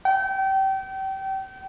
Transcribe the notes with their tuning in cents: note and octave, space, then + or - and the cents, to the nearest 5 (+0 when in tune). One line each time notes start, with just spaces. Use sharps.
G5 -30